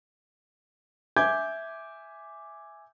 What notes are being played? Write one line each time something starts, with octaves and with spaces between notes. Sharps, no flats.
E5 G#5 D6 G6 G#6